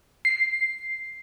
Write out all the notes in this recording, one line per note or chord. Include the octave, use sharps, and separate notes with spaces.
C7